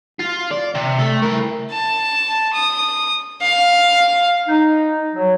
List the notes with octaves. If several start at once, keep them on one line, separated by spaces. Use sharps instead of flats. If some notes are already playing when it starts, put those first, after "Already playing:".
F4
D5
C3
A3
E4 A#4
A5
D#6
F5
D#4
F#3